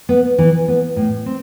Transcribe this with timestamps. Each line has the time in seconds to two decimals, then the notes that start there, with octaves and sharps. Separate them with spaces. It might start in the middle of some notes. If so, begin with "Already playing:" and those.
0.09 B3
0.38 E3
0.68 B3
0.96 A2
1.26 C4